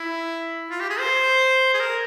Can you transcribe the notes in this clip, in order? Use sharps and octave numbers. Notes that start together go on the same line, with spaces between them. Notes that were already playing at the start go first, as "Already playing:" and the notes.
Already playing: E4
F4
G4
G#4
C5
G#4
A#4